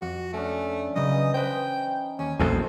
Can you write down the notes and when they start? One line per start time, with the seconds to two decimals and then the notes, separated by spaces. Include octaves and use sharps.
0.02 F2 F#4
0.33 A3 C#4 D4
0.96 C#3 E3 F#3 C#4 D#4 D#5
1.34 B4 C5 G5
2.19 D#2 C#4
2.39 A#1 E2 F#4 A4 C5 G#5